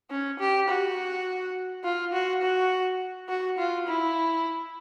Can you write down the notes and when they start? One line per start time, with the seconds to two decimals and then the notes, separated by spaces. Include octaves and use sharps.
0.10 C#4
0.39 G4
0.68 F#4
1.84 F4
2.13 F#4
2.42 F#4
3.29 F#4
3.58 F4
3.87 E4